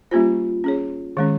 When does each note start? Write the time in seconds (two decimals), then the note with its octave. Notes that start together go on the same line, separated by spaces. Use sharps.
0.11 G3 A#3 C#4 F4 G4 C5
0.64 C#4 G#4 C#5
1.17 D#3 G#3 C#4 G#4